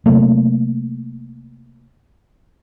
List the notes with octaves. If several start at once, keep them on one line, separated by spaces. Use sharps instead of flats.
C3 F#3 A3 A#3